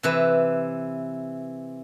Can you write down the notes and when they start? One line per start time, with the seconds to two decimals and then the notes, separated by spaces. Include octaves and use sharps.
0.03 C3 E3 B4